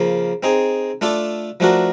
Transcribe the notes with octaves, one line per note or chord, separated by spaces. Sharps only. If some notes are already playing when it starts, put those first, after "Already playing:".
Already playing: C#3 F3 A#3
C4 D#4 G#4
A3 D4 F4 A4 D5
F3 A3 D4 F#4 A#4